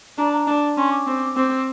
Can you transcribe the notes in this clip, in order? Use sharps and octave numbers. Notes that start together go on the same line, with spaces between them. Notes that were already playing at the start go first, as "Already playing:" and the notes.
D4 A#5
A#5
D4
C#4 C6
D6
C4
C4